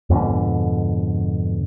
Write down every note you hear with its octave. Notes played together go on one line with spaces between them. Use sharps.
F2 G#2 B2 D3